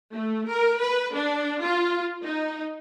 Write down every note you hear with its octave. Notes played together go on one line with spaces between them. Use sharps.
A3
A#4
B4
D4
F4
D#4